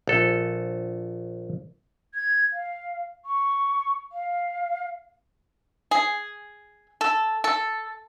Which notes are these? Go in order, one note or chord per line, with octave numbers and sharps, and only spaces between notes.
A#1 A4
G#6
F5
C#6
F5
G#4
A4
A4